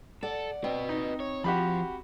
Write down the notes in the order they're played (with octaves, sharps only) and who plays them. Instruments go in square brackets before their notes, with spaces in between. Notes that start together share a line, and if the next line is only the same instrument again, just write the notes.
[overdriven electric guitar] A4 [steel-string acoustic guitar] D5 F#5
[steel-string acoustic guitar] C4 [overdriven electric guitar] B4 D#5
[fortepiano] D#4
[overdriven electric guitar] C#5
[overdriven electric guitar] F3 [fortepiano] F#4 G4 B5